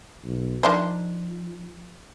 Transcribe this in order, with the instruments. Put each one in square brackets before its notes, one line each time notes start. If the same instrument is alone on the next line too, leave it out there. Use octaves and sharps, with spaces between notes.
[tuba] B1
[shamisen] D#3 D4 C5 [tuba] F3